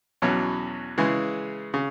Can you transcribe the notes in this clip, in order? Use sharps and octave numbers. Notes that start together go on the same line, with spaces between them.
E2 B2 F#3 C#4
C#3 E3 G#3
C#3